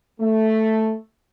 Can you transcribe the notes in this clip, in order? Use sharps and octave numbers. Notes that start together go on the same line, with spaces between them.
A3